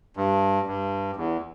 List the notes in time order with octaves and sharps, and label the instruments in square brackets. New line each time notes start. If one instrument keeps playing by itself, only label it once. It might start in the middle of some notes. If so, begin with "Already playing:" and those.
[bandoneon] G2
G2
E2